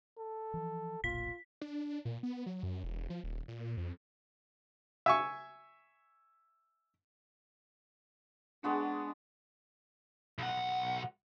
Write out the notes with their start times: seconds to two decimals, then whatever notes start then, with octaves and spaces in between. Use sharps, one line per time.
0.17 A4
0.54 E3 F3
1.04 F1 B1 A#2 F4 B6
1.61 D4
2.05 A#2
2.23 B3
2.46 F#3
2.63 F#2
2.84 E1
3.10 F3
3.24 D#1
3.48 A#2
3.77 F2
5.06 E5 G#5 C#6
8.64 G#3 B3 D4 F#4
10.38 B1 F#5